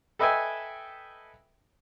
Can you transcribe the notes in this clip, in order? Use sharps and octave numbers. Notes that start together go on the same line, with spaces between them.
A4 B4 D#5 E5 G5 G#5